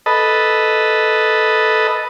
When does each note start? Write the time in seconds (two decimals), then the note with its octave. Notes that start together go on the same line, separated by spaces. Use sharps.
0.06 A4 B4 D#5